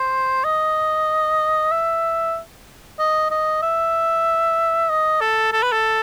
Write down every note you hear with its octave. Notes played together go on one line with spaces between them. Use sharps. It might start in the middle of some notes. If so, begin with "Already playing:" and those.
Already playing: C5
D#5
E5
D#5
D#5
E5
D#5
A4
A4
B4
A4